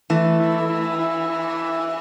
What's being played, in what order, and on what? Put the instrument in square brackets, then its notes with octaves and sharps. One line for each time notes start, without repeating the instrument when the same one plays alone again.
[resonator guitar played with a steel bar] E3 [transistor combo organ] A3
[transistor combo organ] E4
E4
E4
E4